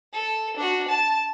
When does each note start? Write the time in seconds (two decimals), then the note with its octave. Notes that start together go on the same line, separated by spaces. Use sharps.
0.13 A4
0.56 D4 F#4
0.88 A5